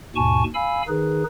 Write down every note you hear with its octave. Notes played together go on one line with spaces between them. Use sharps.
D#2 G#2 B2 G#5 A5 C#6
F5 G#5 B5 E6
D#3 D#4 G#4 B4